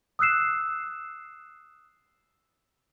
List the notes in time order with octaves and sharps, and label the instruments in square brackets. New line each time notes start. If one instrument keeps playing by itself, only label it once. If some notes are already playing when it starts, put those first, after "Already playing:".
[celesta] D#6 E6 F#6 C7 E7